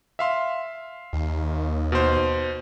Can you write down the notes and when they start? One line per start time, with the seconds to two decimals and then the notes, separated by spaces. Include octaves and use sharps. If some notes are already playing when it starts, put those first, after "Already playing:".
0.19 E5 F5 C6
1.13 D#2
1.92 B2 C5